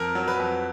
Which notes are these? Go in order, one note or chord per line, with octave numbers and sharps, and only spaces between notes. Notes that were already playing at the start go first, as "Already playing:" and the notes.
Already playing: F2 A#4
F#3
B4
F2